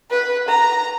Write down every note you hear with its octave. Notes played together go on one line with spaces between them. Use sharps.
B4
A#5